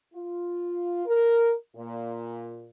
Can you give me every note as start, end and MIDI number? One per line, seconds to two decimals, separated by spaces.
0.14 1.04 65
1.06 1.52 70
1.75 2.69 46